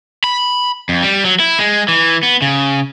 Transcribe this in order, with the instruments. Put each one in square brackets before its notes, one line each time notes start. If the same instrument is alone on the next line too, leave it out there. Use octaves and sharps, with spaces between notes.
[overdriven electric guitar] B5
F2
G3
F#3
E4
G#3
E3
B3
C#3